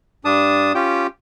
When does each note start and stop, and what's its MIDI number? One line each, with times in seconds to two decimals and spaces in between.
0.25 0.72 43
0.25 0.72 62
0.25 0.72 81
0.25 0.72 87
0.75 1.07 61
0.75 1.07 65
0.75 1.07 67
0.75 1.07 79